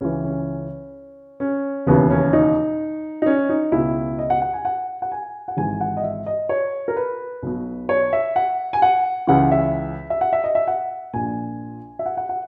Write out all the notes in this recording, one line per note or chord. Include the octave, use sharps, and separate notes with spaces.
C#2 C#3 E3 C#4
C#4
C#4
E1 D#2 C#3 E3 B3
C#4
D#4
D#4
C#4
D#4
C#2 B2 E4
D#5
F#5
F#5
G#5
F#5
F#5
G#5
F#5
G#1 G#2 E3 G#5
F#5
D#5
E5
D#5
C#5
A#4
B4
B1 B2
C#5
E5
F#5
G#5
F#5
C#2 C#3 E3 F#5
E5
E5
F#5
E5
D#5
E5
F#5
A#1 A#2 G#5
E5
F#5
F#5
F#5